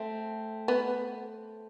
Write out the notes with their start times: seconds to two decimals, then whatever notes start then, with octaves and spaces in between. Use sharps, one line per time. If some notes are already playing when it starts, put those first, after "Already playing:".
Already playing: A3 C4
0.68 B3